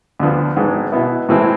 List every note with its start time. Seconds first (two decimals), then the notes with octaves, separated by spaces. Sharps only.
0.20 D2 D3 F3 B3
0.56 G#1 G#2 G#3 B3
0.92 B2 B3 E4
1.29 A2 E3 G#3 C4 E4